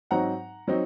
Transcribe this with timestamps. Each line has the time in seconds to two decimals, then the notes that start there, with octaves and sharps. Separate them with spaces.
0.11 G#2 F#3 C4 D#4 F#5 A#5
0.68 F#3 C4 D#4